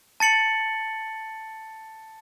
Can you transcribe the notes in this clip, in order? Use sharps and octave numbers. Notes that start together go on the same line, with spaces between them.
A5 A6 C#7 F#7